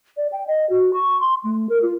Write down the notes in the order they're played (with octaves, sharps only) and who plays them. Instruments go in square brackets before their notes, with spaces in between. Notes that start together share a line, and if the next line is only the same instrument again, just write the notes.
[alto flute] D5
G5
D#5
F#4
C#6
C6
A3
A#4
F4